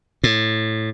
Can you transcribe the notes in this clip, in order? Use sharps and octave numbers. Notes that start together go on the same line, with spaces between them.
A2